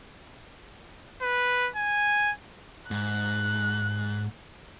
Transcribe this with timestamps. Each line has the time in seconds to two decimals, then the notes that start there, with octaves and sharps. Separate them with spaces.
1.22 B4
1.76 G#5
2.91 G#2 F#6